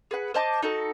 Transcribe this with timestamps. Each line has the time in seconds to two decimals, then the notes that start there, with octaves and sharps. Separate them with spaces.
0.11 G#4 B4 F#5
0.34 C5 D#5 A5 D6
0.62 D#4 F#4 A4